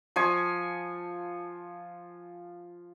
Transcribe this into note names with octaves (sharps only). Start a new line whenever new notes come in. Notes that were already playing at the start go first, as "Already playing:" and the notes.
F3 G#5 C#6